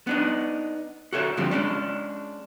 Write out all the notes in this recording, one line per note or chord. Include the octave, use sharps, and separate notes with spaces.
B3 D4 D#4
F#4 A4 C#5 E5
G#2 D3 F3 G3 C4
G#3 C#4 D4